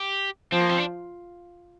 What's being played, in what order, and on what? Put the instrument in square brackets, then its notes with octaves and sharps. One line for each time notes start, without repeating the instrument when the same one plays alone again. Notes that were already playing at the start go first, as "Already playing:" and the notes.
Already playing: [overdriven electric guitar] G4
[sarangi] F3 [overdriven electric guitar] C4
[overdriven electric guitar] A#3
C4
D4